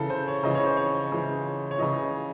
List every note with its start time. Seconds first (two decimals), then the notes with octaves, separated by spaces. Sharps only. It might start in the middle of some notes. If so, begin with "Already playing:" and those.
Already playing: C#3 E3 A4
0.10 C5
0.28 C#5
0.43 C#3 E3 D#5
0.55 C#5
0.66 C5
0.77 C#5
1.12 C#3 E3
1.71 C#5
1.78 C#3 E3 D#5